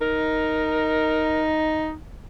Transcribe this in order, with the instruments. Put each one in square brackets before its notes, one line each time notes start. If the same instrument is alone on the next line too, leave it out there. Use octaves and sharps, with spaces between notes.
[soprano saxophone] D#4 [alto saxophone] A#4